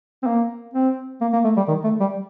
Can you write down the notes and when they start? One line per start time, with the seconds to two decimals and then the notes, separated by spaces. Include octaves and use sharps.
0.23 C4
0.27 A#3
0.74 C4
1.21 A#3
1.33 A#3
1.44 A3
1.57 G3
1.68 D#3
1.84 A3
2.00 G3